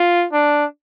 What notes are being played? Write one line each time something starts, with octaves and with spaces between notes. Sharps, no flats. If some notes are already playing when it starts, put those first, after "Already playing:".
Already playing: F4
D4